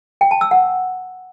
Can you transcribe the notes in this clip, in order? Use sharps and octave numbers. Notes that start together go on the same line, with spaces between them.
G5
A5
E6
F#5